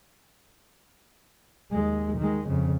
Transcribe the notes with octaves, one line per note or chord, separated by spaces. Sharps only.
D#2 G#3
D#3 G#3
F2 C#3